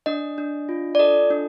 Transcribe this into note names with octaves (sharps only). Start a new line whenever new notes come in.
D4 D#5
D4
F4
D5
A4 D#5
D4